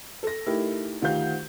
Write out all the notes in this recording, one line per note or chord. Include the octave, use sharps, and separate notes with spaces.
A4 A#6
A3 D#4 E4 G4 A#4
D2 D#3 F4 G4 F5 G6